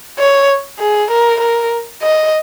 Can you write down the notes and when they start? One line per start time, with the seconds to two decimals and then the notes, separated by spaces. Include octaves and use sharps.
0.19 C#5
0.80 G#4
1.10 A#4
1.41 A#4
2.02 D#5